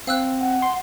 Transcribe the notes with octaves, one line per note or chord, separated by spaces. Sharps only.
C4 F5 E6 F#6
F#5
C6